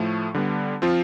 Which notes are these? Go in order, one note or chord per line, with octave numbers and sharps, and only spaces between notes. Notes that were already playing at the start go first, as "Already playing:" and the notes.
Already playing: A2 F3 A3
D3 G3 B3
F3 C4 F4